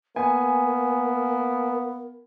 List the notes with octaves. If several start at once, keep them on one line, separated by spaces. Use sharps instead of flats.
A#3 B3 A#4 G#5